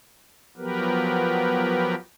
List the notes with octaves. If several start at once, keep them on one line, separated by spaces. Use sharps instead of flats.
F3 F#3 B3 G4 A#4 B4